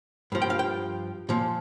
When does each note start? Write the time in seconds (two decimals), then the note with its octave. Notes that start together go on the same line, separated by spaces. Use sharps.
0.32 G2 F3
0.42 G5
0.50 F5
0.59 G5
1.29 A#2 F3